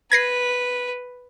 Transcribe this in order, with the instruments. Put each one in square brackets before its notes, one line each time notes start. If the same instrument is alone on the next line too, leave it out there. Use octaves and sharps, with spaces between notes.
[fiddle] B4 [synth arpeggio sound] G#6 A#6 C7